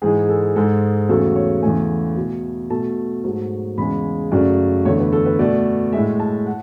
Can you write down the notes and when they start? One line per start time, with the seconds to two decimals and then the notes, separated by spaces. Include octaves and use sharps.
0.02 G#2 E3 G#3 G#4
0.29 A4
0.56 G#2 G#3 A4
1.09 E2 C#3 F#3 A3 A4
1.35 C#5
1.63 E2 C#3 E3 A3 G#5
2.17 B2 A3
2.70 B2 A3 A5
3.24 G#2 F#3 A3
3.78 E2 C#3 G#3 B5
4.31 F#2 C#3 F#3 A3 D5
4.85 E2 D3 A3 C#5
4.98 B4
5.12 A4
5.26 B4
5.39 B2 A3 D5
5.92 A2 G#3 E5
6.20 A5
6.46 F#5